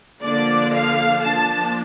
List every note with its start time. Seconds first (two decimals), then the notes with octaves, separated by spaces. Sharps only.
0.22 D3 F3 A#3 D4 D5
0.73 F5
1.24 F3 A#3 D4 A5